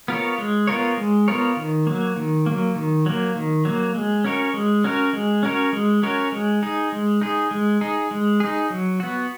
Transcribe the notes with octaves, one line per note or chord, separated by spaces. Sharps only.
B3 F4 A#4 C#5
G#3
B3 F4 A#4 C#5
G#3
B3 F4 A#4 C#5
D#3
F#3 A#3
D#3
F#3 A#3
D#3
F#3 A#3
D#3
F#3 A#3
G#3
C#4 F#4 A#4 C#5
G#3
C#4 F#4 A#4 C#5
G#3
C#4 F#4 A#4 C#5
G#3
C#4 F#4 A#4 C#5
G#3
D#4 G#4
G#3
D#4 G#4
G#3
D#4 G#4
G#3
D#4 G#4
F#3
B3 F#4